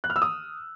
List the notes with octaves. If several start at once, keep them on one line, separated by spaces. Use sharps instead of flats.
F#6
F6
E6
D#6